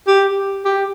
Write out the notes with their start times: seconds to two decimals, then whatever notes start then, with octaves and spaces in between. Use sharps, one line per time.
0.08 G4
0.65 G4